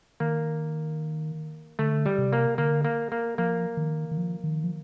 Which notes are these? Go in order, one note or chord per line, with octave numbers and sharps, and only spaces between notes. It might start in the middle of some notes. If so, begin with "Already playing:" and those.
D#3 A#3
D3 A3
G3
C3
A#3
D3 A#3
A#3
A#3
F3 A#3
D#3
D#3
F3
D#3
F3